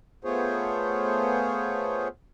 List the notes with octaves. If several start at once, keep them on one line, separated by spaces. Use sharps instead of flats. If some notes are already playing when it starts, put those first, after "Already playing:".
A3 B3 F4 G#4 C5 C#5